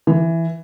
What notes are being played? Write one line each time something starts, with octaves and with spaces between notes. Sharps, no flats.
E3